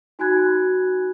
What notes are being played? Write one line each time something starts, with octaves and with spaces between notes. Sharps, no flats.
D#4 F#4 G#5 B5 F#6 G#6